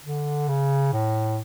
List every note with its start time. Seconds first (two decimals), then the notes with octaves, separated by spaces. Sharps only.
0.04 D3
0.48 C#3
0.93 A2